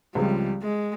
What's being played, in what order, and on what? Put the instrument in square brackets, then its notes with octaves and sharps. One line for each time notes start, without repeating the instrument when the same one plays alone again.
[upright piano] C#2 C#3 F3 G#3 C4 [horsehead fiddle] G3
[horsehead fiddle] G#3